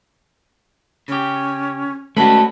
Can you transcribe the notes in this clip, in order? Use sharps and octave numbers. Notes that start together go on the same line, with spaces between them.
C#3 C#4 G4
G#3 A3 C#4 F#4 B4 A5 B5